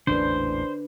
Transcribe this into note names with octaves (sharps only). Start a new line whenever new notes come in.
A1 E2 A#2 D4 B4 C5